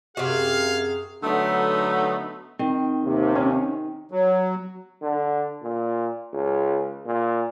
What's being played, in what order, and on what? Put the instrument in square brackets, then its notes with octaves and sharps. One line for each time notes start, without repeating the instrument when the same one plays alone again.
[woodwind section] F#2 G#4 [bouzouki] C3 F#4 [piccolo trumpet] F5
[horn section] D3 F#3 A3 B3 D#4
[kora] D#3 [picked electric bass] C4
[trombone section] D#2 C3
[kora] D#3 [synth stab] C#4
[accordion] F#3
[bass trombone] D3
A#2
C#2
A#2